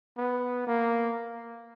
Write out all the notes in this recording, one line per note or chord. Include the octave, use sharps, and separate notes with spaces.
B3
A#3